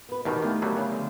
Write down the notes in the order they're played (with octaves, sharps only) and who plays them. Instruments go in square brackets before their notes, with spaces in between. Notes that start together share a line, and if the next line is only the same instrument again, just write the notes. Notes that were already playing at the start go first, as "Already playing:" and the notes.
[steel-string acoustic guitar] B3 B4
[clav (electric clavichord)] E2 B2 D#3 [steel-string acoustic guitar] G4 A#4 D5
[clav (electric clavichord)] D#3 [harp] A3 B3 F4
[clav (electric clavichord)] D3 F#3 G3
C#3
[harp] D3 F3